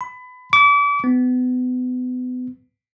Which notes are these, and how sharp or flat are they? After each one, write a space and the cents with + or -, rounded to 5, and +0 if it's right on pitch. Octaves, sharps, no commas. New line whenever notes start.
B5 +25
D6 -35
B3 +30